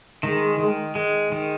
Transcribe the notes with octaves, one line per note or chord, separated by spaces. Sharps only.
D#3 G#3
D#3
G#3
D#3